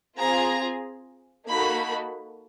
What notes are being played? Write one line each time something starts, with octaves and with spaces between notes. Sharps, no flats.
C4 F4 G#4 A#5
A#3 D#4 F#4 A4 B5